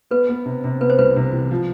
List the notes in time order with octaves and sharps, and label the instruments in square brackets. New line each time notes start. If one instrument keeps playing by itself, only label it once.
[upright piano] B3 [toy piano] B4
[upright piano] B3
C3
C3
[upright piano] B3 [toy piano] B4
[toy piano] C5
[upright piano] C2 [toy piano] B4
[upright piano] C3
E3
F3